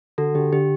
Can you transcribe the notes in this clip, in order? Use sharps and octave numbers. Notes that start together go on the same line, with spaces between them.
D3 F#4 A4
D3 G4
D3 G4